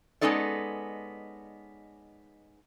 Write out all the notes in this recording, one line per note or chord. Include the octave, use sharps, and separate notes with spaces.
G#3 B3 C#4 D#4 A4 D5